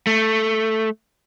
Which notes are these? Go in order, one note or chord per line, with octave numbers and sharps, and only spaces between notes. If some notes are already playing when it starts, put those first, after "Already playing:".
A3